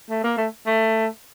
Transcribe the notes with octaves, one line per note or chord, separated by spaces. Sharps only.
A3
A#3
A3
A3